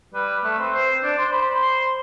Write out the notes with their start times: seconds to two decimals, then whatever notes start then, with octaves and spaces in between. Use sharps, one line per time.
0.14 G3 B4
0.44 A3 B4
0.59 C4
0.73 C5
1.03 D4 D5
1.18 C5
1.32 C5 B5
1.62 C6